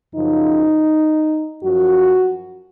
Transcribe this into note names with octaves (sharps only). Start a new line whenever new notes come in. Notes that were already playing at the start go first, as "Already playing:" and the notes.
F#2 C#3 F3 D#4
F#2 F3 F#4